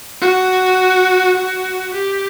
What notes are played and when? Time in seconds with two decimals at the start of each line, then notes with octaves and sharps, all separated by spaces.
0.22 F#4
1.36 F#4
1.94 G4